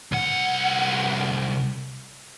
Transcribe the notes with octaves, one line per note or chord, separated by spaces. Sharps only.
C2 F#5